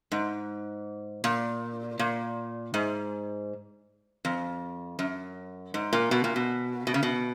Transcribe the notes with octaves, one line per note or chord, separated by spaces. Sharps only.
G#2
A#2
A#2
G#2
F2
F#2
G#2
A#2
B2
A#2
B2
B2
C#3
B2